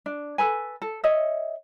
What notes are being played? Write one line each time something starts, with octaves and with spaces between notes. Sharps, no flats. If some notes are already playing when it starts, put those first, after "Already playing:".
D4
A4 B4 G#5
A4
C#5 D#5 E5